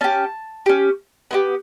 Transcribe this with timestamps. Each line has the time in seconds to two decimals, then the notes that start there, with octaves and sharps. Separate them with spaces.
0.01 C#4 G4 A5
0.66 C#4 G4
1.31 B3 E4 G4